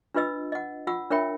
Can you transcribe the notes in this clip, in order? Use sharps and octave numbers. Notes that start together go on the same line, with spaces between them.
D4 F4 B4 D#5 E6
D#5 F#5
F4 F#5 B5 E6
D4 A#4 C#5 E5 G5 B5